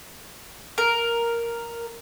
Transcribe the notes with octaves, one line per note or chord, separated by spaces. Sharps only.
A#4